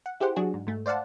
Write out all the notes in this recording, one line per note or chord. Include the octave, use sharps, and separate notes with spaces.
F#5
E4 G4 G#4 C5 F#5
F#3 D4 F#4 G#4
G#2
G#2 A3
C5 D5 F5 F#5 A5